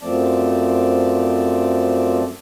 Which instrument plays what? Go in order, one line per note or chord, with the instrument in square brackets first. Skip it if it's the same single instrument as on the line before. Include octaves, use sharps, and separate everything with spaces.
[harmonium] F#2 F3 A3 C4 D5 A5